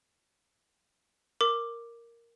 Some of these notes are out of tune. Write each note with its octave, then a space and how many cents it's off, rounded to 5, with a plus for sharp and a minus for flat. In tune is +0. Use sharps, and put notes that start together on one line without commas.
A#4 +0 D6 +5